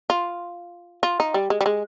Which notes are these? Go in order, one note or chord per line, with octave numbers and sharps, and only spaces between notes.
F4
F4
D#4
G3
G#3
G3
G#3